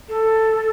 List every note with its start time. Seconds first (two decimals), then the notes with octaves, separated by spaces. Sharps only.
0.09 A4